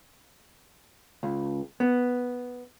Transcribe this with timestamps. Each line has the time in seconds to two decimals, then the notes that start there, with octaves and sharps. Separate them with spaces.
1.23 C#2
1.80 B3